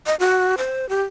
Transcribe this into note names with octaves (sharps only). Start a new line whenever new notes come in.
D#5
F#4
C5
G4